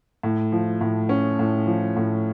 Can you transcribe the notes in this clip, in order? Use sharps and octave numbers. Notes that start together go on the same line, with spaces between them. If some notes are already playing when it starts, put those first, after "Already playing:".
A2
F3
A2
C#4
A2
F3
A2